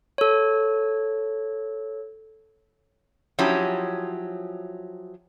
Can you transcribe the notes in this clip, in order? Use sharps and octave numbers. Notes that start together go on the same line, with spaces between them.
A4 C#5
F3 F#3 C#4 E4 G4